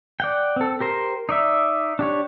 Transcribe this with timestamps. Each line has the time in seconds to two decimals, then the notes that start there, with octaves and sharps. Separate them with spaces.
0.20 D5 F#5 G5
0.56 C4 A4
0.80 G4 A#4 C5
1.29 D#4 D5 E5
1.99 D4 G4 C#5